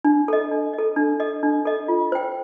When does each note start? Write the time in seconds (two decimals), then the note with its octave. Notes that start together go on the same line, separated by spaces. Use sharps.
0.04 D4
0.28 A4 D#5
0.51 D4
0.74 A4 D#5
0.96 D4
1.20 A4 D#5
1.43 D4
1.66 A4 D#5
1.88 F4
2.12 C5 G5